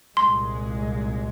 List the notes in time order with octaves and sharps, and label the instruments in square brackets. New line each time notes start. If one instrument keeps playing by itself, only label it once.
[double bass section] C2 A#2 G#3 [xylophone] C6